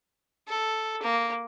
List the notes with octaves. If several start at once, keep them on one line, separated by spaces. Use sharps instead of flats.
A4
A#3